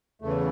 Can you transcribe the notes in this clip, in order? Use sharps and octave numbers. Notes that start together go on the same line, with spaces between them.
E2 C#3 E3 A3